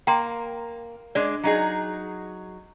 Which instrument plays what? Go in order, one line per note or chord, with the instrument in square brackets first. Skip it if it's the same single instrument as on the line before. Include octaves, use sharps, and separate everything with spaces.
[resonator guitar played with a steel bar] A#3 [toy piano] G5 A#5 C6
[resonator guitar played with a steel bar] G#3 D4 [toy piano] D5
[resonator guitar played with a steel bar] F#3 D#4 G#4